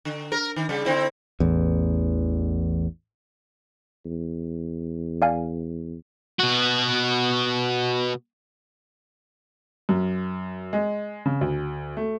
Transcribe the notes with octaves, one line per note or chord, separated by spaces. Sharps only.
D3
A#4
D#3
C#3 G3
D3 C4 E4
A1 E2
E2
D5 F5 G#5
B2 F#4
F#2
G#3
C#3
D2
A3